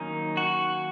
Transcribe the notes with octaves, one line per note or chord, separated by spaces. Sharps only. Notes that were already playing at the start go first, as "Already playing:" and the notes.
Already playing: D#3 F#3 A#3 C#4 D#4
F#4